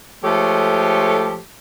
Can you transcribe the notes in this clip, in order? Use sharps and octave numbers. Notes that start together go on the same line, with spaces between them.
F3 G#3 A3 G4 A4 C#5